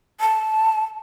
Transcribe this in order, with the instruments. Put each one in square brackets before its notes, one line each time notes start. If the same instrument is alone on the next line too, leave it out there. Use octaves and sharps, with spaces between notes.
[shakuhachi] A5